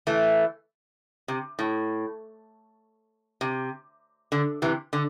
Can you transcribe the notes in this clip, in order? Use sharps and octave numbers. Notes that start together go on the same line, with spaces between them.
E3 A3
C3
A2
C3
D3
C3 E3
D3